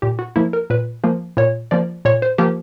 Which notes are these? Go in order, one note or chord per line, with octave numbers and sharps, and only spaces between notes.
A#2 G4
F#4
F3 A#3 E4
A#4
A#2 B4
F3 A#3
A#2 C#5
F3 A#3 D5
A#2 C#5
C5
F3 A#3 G4